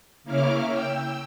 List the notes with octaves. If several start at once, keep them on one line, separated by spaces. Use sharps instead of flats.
C#3 A#3 C#4 E4 D6 F6
G5 E6